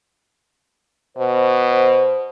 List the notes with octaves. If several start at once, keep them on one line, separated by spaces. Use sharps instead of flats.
B2 C5